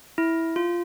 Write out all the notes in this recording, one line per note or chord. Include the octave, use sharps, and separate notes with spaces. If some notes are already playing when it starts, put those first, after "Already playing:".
E4
F4